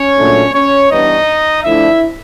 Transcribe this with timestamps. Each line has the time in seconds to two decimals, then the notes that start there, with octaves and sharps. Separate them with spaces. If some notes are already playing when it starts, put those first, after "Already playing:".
Already playing: C#4 C#5
0.17 A#2 F#3 A3 D4
0.53 C#4 C#5
0.90 E3 G3 B3 D4 D#4 D#5
1.63 D3 F3 A3 D4 E4 E5